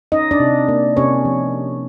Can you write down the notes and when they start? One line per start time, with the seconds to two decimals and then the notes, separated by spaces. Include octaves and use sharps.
0.12 C#4 D#4 D#5
0.31 D4 D5
0.40 C3
0.68 A#3
0.97 C3 C#4 C#5
1.25 F3